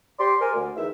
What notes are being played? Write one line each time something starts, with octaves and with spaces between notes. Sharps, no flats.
G4 D5 C6
A#4 C5 D5 G#5
D2
E2 D#3 E5